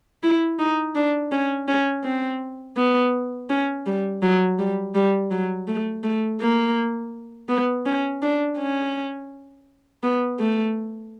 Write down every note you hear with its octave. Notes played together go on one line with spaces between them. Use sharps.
E4
D#4
D4
C#4
C#4
C4
B3
C#4
G3
F#3
G3
G3
F#3
A3
A3
A#3
B3
C#4
D4
C#4
B3
A3